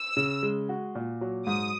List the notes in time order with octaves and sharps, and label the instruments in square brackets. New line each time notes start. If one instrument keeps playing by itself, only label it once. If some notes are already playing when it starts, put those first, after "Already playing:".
Already playing: [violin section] E6
[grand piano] C#3
G#3
F#4
A#2
F#3
[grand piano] G#2 [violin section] D#6